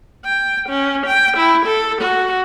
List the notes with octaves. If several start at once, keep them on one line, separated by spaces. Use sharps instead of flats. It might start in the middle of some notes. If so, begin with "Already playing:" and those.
G5
C#4
G5
E4
A4
F#4